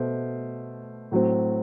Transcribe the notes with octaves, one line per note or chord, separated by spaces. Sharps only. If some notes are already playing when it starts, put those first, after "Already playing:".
Already playing: B2 A3 C5
A2 F#3 C4